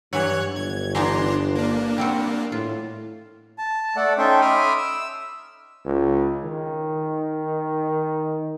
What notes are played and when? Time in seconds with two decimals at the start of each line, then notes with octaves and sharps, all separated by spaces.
0.13 G2 E3 F#3 C#5 F#6 G#6
0.56 G1 G#6
0.95 E3 B3 D4 D#4 A#5 C6
1.56 A#3 D4
1.98 G3 C4 F#4
2.52 A2 F4
3.58 A5
3.97 A3 A4 D5 F#5
4.18 C#4 D#4 A4 E5 G5 C6
4.41 E5 B5 C6 D6 D#6 F6
4.77 E6
5.86 C#2
6.44 D#3